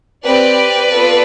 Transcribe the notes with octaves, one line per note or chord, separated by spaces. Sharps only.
C4 G4 B4 D5
B3 F4 A4